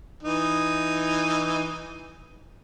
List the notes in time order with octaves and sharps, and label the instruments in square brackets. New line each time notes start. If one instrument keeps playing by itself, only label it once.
[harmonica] E3 D#4